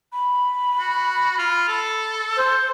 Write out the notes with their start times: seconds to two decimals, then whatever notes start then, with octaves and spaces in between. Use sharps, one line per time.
0.12 B5
0.80 F#4
1.38 F4
1.68 A4
2.36 C5